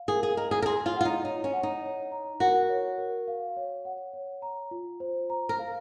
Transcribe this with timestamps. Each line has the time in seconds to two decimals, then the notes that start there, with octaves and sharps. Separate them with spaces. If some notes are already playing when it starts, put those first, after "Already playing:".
Already playing: F5
0.08 G#4 A#4
0.23 G#4
0.37 A#4 D#5
0.51 G#4
0.62 A#4
0.66 G#4 C6
0.86 F4
0.96 F4 F#5
1.05 D#4
1.24 D#4 C#5
1.44 C#4
1.53 F#5
1.63 D#4
1.82 C#5
2.12 A#5
2.40 F#4 A#4
2.69 C#5
2.98 A#4
3.28 F5
3.57 C#5
3.85 F#5
4.13 C#5
4.42 A#5
4.71 F4
5.00 C5
5.30 A#5
5.49 A#4
5.59 F5